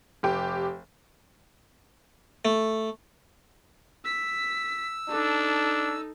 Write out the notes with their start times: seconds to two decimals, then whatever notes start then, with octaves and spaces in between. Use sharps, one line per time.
0.23 F1 G4 G5
2.45 A3
4.05 E6 B6
5.09 D4 D#4 A4